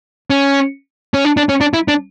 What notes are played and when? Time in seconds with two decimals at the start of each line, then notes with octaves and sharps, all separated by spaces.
0.30 C#4
1.14 C#4
1.25 D4
1.37 D4
1.49 C#4
1.61 D4
1.74 E4
1.88 D4